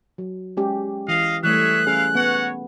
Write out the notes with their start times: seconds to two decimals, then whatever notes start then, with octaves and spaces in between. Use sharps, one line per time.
0.18 F#3
0.57 G#3 C#4 G4
1.08 E3 D#5 F5
1.43 E3 G3 A3 G#4 C#5 E5 F#6
1.86 C#4 E4 G#4 F5
2.15 B3 F#4 C#5 F#5